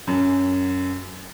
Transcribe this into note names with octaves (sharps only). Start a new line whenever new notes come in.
F#2